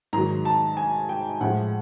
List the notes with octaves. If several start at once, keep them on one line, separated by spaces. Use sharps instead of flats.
G#2 D#3 F#3 A#5
A5
G#5
G5
A2 F3 G#3 F#5